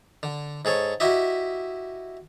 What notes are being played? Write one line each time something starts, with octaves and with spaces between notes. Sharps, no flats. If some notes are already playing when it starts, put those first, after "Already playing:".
D3
G#2 G#4 A4 C#5
E4 F#4 G4 D#5 E5